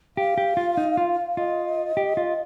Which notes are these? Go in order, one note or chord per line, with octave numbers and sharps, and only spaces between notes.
G4 F5
G4
F4
D#4
F4
F4 D#5
G4
F4